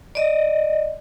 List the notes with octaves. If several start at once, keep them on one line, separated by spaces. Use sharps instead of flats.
D5 D#5